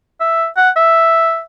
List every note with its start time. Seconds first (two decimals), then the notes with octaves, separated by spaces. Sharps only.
0.20 E5
0.57 F#5
0.76 E5